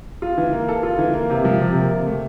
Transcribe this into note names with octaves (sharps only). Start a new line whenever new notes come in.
F4
E3
A#3
A4
F4
E3
A#3
C3
F3
C3
A#3
C3
A3